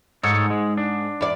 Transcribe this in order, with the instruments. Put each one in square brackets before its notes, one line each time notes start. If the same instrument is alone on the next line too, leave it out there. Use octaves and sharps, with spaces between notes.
[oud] G#2 [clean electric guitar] D#4 A4 C#5
[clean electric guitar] G#3
D4
[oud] E2 D5